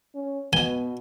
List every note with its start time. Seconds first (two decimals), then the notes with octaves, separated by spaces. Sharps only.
0.14 C#4
0.53 B2 B3 G#5 G7